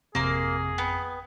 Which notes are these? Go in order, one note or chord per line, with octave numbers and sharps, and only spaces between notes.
G#1 F2 C3 A#3 G#4 C6
B3 G5